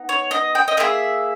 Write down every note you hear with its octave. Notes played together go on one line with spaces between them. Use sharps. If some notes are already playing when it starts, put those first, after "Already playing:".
Already playing: B3 D#4
C#5
D#5
G5
D#5
A#3 E4 G#4 E5